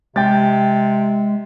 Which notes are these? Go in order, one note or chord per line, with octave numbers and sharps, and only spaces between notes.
C3 G#3 G5 G6 A6